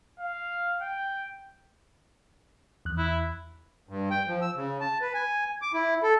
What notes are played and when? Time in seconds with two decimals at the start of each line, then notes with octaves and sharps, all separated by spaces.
0.20 F5
0.81 G5
2.85 E2 F#6
2.98 E4
3.89 G2
4.11 G5
4.27 F3
4.42 E6
4.56 C#3
4.81 A5
5.01 B4
5.14 G#5
5.62 D6
5.74 E4
6.03 A4